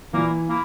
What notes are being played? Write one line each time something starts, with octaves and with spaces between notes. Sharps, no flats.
A#2 E3 A#3 E4
A#3 E4